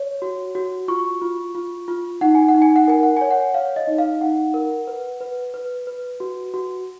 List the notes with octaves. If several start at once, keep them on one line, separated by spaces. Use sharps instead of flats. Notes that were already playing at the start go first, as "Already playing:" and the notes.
Already playing: C#5
F#4
F#4
F4 C#6
F4
F4
F4
D#4 F#5
G#5
F#5
D#4
G#5
F#5
A#4 G#5
F#5
C#5 G#5
F#5
C#5 F5
D#5
D#4
F5
D#4 F#5
A#4
B4
B4
B4
B4
F#4
F#4